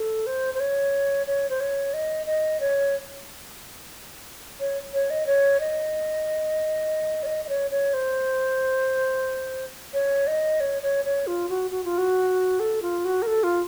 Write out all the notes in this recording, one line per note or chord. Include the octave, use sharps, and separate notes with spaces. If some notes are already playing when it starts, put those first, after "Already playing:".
Already playing: A4
C5
C5
C#5
C#5
C5
C#5
D#5
D#5
C#5
C#5
C#5
D#5
C#5
D#5
C#5
D#5
D#5
C#5
C#5
C5
C#5
D#5
C#5
C#5
C#5
F4
F#4
F#4
F4
F#4
A4
F4
F#4
A#4
A4
F4